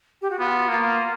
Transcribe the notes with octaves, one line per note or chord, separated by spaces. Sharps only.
G4
F#4
B3 F4
A#3 F4